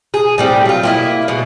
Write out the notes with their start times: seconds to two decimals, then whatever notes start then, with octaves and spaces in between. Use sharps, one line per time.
0.14 G#4
0.38 A2 G3 C4
0.65 F#3 F4
0.83 A#3 E4 D#5
1.28 B2 G#3